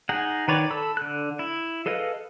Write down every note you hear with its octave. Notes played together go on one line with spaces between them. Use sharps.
D#4 G#4 F#5
D#3 B4 C#5 D5
A4 B5 E6
D3 F#6
E4
G#4 A4 B4 D#5 F5